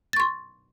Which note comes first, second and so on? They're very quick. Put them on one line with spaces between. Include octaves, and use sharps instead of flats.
A6 C#6 C6